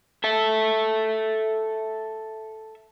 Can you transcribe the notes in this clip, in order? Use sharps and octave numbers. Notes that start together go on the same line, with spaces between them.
A4 E5